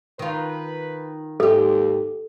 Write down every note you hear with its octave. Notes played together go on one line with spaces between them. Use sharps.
D#3 F4 B4
D#2 G#2 G4 A4